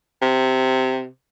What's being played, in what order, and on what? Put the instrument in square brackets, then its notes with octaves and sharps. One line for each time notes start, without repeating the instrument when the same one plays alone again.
[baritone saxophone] C3